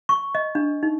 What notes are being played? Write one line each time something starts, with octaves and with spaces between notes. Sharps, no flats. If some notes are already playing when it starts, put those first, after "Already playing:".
C#6
D#5
D4
D#4